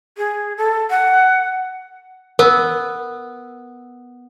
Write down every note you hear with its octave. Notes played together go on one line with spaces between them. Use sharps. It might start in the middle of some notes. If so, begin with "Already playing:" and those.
G#4
A4
F#5
B3 A#4